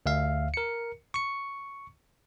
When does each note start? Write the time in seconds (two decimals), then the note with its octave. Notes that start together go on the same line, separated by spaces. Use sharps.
0.06 D2 E5 F5
0.54 A#4 C#7
1.14 C#6 C#7